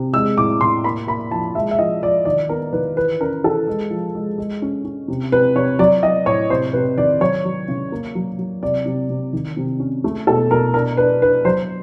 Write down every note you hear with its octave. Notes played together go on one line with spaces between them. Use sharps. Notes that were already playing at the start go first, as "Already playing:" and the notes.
Already playing: C3
G#3 E6
A2 D6
A2 C6
A#3 B5
A#3 B5
F3 A5
G#3 E5
E5
F3 D#5
F3 D5
D#3 D5
B3 A#4
D#3 B4
E3 B4
C#4 A#4
E3 A4
G#3
F3
G#3
G#3
C#4
C#4
C3
C3 B4
C3 C#5
F#3 D5
F#3 D#5
A2 C#5
C3 C5
C3 B4
D#3 D5
F#3 C#5
F#3
C#3
A#3
F#3
F#3
C3 D5
C3
C3
D#3
C3
C#4
A3
B2 A4
B2 A#4
D4 A#4
D4 B4
D4 B4
F#3 C5